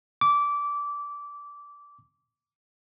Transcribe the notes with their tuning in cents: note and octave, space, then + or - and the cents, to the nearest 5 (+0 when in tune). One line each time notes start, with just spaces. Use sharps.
D6 -20